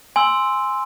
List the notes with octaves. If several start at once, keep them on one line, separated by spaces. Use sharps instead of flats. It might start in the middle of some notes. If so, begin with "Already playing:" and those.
G#5 C6 E6